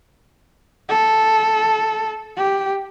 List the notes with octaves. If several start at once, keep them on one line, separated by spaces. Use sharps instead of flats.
A4
G4